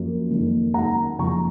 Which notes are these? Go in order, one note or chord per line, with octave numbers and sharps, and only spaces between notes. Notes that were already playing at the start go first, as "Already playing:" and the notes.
Already playing: F#2 F3 A#3
F#1 F2 D#3 A#3
F#2 D#3 A#3 F#5 A#5
F#1 F2 C#3 F3 A#5 C#6